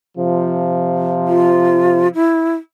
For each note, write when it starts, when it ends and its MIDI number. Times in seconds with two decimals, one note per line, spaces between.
0.18 2.09 48
0.18 2.09 53
1.27 2.08 65
2.15 2.53 64